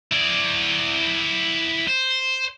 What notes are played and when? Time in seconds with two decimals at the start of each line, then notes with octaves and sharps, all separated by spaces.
0.12 E4 D5
1.87 C5